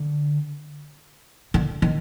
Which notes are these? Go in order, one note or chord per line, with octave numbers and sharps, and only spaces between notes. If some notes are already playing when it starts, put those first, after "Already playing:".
Already playing: D3
D3
D#3